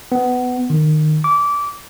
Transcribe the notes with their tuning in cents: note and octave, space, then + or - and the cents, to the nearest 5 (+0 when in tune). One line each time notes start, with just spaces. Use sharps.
B3 +15
D#3 -20
D6 -20